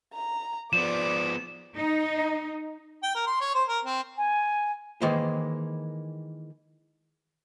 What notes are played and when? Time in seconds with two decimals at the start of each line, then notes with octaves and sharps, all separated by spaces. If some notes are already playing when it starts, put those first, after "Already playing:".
0.14 A#5
0.73 F3 B3 D5 D6 E7
1.76 D#4
3.03 G5
3.15 A#4
3.27 C6
3.41 C#5
3.54 C5
3.68 A#4
3.85 C4
4.18 G#5
5.01 D#3 E3 G#3 A#3 C5